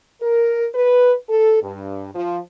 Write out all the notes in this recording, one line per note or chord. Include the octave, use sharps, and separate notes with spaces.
A#4
B4
A4
G2
F3